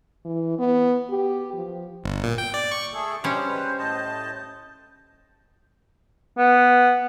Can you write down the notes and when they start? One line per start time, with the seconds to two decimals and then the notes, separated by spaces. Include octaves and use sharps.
0.25 E3
0.59 B3
1.10 G4
1.54 F3
2.04 G1
2.23 A#2
2.38 G5
2.54 D5
2.71 C#6
2.93 A3 G#4 A4
3.24 B2 G3 C#4 D4 G4 C5 G6
3.47 G#3 B4
3.79 A2 D#5 A5
6.38 B3